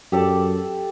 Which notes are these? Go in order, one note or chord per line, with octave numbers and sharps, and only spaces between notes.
F#2 G4 A4 D5